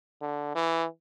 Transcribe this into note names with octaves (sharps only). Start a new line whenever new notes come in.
D3
E3